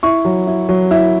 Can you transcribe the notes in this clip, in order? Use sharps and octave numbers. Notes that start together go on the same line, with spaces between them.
E4 C#6
F#3
E4
F#3
E4